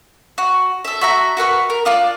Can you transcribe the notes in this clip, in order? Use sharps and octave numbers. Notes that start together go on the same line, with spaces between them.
F#4
A4 E5
F#4 E5 A#5
F#4 A#4 B4 C#6
A#4
D4 F4 D5